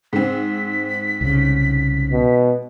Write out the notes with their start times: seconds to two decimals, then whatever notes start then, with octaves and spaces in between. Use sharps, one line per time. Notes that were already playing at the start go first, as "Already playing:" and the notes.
0.13 G#2 C4 B6
1.21 C2 C#3
2.12 B2